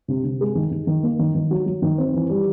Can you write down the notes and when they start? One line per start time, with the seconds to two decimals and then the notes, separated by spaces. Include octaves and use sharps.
0.08 C3
0.24 C3
0.41 G#3
0.55 D#3
0.71 D#3
0.87 D#3
1.03 A#3
1.19 D#3
1.35 D#3
1.51 F#3
1.66 F#3
1.82 D#3
1.98 C4
2.14 E3
2.30 G3